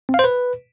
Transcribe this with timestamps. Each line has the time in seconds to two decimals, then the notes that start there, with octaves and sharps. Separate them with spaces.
0.09 C4
0.14 F5
0.19 C5
0.24 B4